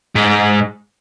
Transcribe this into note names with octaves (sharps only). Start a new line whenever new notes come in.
G#2